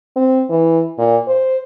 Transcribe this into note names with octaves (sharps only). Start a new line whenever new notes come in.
C4
E3
A#2
C5